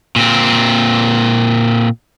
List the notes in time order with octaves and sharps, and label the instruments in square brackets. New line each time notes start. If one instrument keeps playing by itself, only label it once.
[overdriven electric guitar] A#2 C4